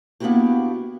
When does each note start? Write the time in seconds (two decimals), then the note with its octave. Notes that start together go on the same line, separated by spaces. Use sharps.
0.20 A#3 B3 D4 E4 F#4 G4